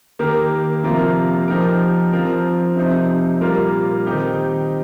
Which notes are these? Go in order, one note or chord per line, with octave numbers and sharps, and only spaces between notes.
D#3 A#3 G4 A#4
C3 F3 A#3 F4 A#4
F3 D#4 G4 A#4
F3 C4 F4 A#4
C3 F3 C4 D#4
A#2 G3 A#3 F4 A#4
D#3 C4 D#4 G4